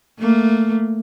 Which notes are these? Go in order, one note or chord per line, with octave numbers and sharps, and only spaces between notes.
A3 A#3